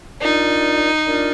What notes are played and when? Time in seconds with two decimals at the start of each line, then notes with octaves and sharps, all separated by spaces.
0.21 D4 D#4 F4 A#4 D5
1.06 D4 F4 A#4 D5